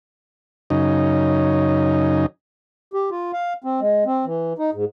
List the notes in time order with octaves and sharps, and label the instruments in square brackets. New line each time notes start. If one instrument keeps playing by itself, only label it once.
[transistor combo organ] F#2 C#3 D#4
[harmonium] G4
F4
F5
C4
G#3
C4
E3
D#4
G#2